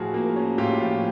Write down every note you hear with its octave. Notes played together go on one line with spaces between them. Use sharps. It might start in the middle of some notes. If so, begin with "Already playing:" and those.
Already playing: A2 F3 F#4 G#4
A#3
C#4
A2 F4 G4
F3